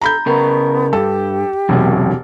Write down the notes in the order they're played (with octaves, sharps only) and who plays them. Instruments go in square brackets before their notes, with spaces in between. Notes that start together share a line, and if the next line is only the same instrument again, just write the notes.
[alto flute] A4 [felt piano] A#5 B5 G6
[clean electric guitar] C#3 A#4 [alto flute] B3
[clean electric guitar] G2 [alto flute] G4 [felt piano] A4
[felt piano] E1 [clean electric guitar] F#2 C3 F#3